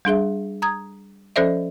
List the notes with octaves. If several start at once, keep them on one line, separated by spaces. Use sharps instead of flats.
G3 D4 G#4 E5
A#5 D#6 G#6
F3 C#4 A4 C5 D5 E5